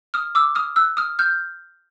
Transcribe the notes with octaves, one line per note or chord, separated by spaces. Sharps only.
D#6 F6
D6 E6
D#6 F6
E6 F#6
D#6 F6
F6 G6